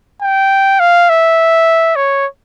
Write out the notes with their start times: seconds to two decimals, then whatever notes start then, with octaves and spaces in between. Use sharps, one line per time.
0.22 G5
0.80 F5
1.09 E5
1.96 C#5